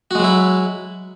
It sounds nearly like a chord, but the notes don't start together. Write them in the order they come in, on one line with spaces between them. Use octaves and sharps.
F#4 G#3 F#3 E4